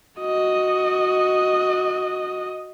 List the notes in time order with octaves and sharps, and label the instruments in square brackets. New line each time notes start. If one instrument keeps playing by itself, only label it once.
[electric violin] F#4 D#5